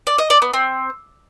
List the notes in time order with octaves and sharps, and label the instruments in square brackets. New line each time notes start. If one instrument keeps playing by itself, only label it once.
[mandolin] D5
D#5
D5
B3
C4